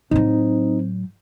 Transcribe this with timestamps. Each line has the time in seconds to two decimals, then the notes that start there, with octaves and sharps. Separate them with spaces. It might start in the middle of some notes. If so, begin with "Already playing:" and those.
0.11 A2 F#3 C4 D#4